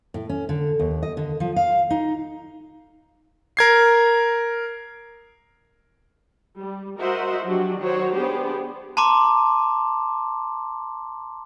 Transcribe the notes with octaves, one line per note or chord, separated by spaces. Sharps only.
A2
C#4
D3
D#2
D#5
D3
F3
F5
D#4
A#4 G#6 C7
G3
F#4 A#4 C5 D#5 E5 F#5
F3 F#3 D4 F#4 G4
D#3 F#3 F#4 C5 C#5
B3 D4 G4 G#4 C5
A5 A#5 C6 D6